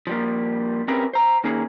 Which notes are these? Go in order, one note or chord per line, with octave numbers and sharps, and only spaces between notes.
F3 G3 A#3
C4 C#4 G4 G#4 A#4 B4
C5 A#5
D#3 A#3 C#4 G#4